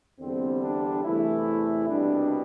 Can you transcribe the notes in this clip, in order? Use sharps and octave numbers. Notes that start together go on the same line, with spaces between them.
E2 D3 G3 C4
D4
E2 C3 E3 A3 E4
C2 B2 G3 D4